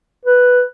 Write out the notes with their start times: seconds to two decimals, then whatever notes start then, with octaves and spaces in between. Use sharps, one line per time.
0.25 B4